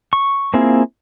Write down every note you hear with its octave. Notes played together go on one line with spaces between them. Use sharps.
C#6
A#3 C4 E4 F4 G#4